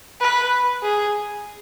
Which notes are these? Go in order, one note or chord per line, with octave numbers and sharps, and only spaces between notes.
B4
G#4